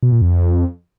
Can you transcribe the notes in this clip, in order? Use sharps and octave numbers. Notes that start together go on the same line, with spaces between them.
B2
A#2
F2